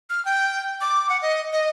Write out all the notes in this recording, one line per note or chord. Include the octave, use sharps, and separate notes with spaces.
F6
G5
D6
F#5
D#5
D#5